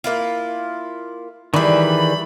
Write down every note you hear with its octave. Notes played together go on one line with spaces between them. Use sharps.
A#3 E4 F4
D#3 E3 G3 G#4 D5 B5